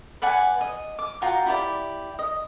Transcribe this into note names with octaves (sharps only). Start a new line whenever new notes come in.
B4 D5 F#5 G#5
D#5
D6
F4 F#4 G5 A#5
E4 G4 D5
D#5